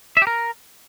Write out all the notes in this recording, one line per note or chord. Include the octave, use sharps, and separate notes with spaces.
E5
G4
A#4